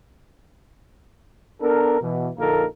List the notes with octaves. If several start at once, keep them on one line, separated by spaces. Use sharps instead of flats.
B3 D4 A4 A#4
B2 E3
A#1 D3 A#3 D#4 A4 A#4